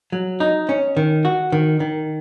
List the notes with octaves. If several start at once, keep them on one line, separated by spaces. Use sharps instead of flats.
F#3
D#4
C#4
D#3
F#4
D#3
D#3